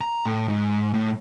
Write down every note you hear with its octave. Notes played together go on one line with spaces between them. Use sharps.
A#5
A2
G#2
A2